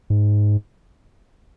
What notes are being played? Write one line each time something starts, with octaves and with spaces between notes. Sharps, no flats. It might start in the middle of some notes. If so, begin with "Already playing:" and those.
G#2